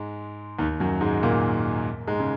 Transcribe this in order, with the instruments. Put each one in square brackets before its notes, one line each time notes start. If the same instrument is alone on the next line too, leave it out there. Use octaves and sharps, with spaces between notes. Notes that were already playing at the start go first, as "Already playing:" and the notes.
Already playing: [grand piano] G#2 G#3
D#2 D#3
F#2 F#3
G#2 G#3
A#2 A#3
G#2 G#3
C#3